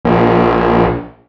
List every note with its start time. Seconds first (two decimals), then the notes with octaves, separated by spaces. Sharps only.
0.05 A#1